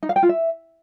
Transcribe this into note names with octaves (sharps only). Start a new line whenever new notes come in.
D#4
F5
G5
F4
E5